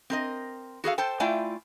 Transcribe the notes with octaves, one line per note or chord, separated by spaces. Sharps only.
C4 A#4 D#5
F#4 G#4 A4 F5
A4 C5 G5 A5
A3 E4 F4 D5 G5 G#5